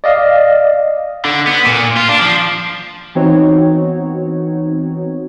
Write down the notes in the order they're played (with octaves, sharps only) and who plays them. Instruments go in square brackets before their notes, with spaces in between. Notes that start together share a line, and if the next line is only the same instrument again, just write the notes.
[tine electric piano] D5 D#5 F5
[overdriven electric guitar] D3
B3
A#2
F4
D4
F3
[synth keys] E3 B3 C4 D#4 F#4 C#5